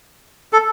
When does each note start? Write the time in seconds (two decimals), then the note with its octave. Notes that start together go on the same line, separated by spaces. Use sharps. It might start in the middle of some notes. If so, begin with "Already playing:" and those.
0.53 A4